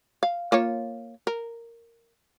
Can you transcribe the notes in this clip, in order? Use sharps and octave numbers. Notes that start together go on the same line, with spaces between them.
F5
A#3 F4 C#5
A#4